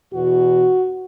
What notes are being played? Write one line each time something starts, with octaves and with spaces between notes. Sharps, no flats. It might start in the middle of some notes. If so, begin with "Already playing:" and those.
E2 B2 F#4